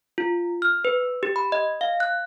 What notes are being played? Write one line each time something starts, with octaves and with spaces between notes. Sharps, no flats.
F4
F6
B4
G4
B5
D#5
F5
F#6